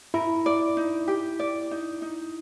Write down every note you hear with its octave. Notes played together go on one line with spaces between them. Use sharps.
E4 A#4
D5
D#4
G4
D5
D#4
D#4